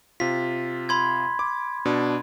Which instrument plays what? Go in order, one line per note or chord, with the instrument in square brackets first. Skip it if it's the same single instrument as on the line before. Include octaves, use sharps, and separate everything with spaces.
[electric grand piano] C3 F4 [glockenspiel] B6
[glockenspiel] B5 C6 G#6
[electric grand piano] D6
B2 D4